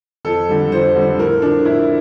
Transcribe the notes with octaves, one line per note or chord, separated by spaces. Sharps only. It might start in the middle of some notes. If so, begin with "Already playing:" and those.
F2 A4
D3 G3
F2 C5
D3 G3
A2 A#4
F3 D4
A2 E4